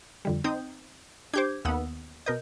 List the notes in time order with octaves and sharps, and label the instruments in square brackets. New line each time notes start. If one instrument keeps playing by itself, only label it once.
[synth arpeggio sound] F2 D3 G3
[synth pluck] C4 D#4 [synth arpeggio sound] D#6 G6
[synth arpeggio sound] D4 G4 C5 [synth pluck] D6 G6 G#6
[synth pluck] D#2 B3 [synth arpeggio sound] F#5 D#6 E6
[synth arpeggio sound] B2 A#4 G6 [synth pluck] D#5